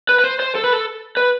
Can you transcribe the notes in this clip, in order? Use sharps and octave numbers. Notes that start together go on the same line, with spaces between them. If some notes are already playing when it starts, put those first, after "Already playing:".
B4
B4
C5
C5
A4
B4
A4
B4